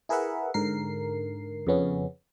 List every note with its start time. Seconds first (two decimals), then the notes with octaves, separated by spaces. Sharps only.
0.09 E4 G#4 A#4 B4 E5 F#5
0.54 G#2 D3 A#4 C7
1.67 F2 C#3 B3 C#4